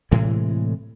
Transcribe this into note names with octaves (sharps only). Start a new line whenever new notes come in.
A2 C3 E3 G#3